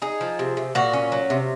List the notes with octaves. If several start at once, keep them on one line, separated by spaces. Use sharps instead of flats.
D#4 G#4
F3
C3
C3
A#2 F#4
C#4
F#3
C3